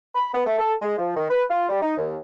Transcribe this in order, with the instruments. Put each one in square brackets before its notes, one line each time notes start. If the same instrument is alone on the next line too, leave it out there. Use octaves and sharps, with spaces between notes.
[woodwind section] B5
B3
A3
A4
G#3
F3
D#3
B4
F4
G3
D#4
D#2